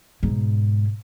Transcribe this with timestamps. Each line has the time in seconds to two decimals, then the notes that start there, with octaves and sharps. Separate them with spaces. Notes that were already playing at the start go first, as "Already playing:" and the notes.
0.23 G#2 B2